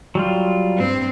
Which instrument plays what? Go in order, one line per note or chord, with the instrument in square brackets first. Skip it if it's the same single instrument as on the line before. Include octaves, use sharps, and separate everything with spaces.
[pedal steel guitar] F#3 G3 F4
[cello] G2 C4